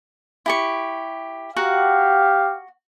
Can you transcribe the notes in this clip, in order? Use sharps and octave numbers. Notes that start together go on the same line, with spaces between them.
E4 G4 C#6
F#4 G4 F5 F#5 A#5